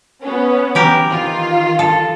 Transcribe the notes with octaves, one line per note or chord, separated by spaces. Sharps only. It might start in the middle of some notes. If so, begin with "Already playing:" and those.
B3 C#4
E3 G4 A#4
D#3 F4
A4